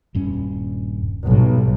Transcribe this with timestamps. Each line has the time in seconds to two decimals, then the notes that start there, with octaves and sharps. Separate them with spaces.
0.15 D#1 G2 C#4
1.27 B1 G#2 G3